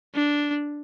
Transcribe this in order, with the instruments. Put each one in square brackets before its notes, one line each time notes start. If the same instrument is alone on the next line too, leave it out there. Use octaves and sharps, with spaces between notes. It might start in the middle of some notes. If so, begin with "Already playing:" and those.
[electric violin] D4